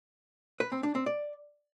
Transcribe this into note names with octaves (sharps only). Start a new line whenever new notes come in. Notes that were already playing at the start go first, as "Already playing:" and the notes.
B4
C4
D4
C4
D5